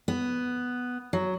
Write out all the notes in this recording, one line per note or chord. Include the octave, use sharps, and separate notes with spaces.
B3
F#3